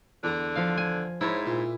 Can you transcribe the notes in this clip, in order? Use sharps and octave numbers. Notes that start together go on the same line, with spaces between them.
E2 D3 A#5
F3 F5
G#5
G#2 E4 A#4 C#5
A#2